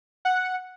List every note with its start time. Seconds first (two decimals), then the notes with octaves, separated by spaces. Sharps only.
0.25 F#5